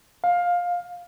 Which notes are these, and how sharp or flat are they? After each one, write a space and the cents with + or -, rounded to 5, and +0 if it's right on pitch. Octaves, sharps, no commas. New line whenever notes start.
F5 +15